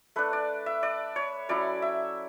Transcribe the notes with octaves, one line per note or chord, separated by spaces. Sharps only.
A3 D4 B4
D5
E5
D5
C#5
F#3 C#4 E4 D5
E5